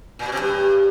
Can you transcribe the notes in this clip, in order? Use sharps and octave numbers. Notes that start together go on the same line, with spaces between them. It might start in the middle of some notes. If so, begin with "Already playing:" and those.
A#2
B2
C3
G2